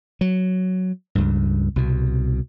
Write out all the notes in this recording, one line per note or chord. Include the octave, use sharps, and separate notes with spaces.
F#3
C#2 G2
C2 B2